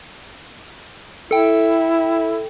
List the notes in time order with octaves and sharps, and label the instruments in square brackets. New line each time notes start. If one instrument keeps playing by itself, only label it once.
[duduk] E4 [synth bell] A4 G5